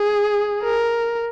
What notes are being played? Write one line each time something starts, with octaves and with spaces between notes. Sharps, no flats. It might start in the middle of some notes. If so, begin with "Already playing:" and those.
Already playing: G#4
A#4